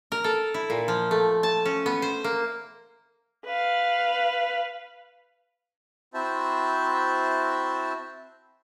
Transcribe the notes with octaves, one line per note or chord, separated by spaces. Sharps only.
A#4
A4
E4
A#2
F3
A3
A5
C#4
B3
C5
A#3
B4 F5
C4 E4 F#4 C5 E5 A5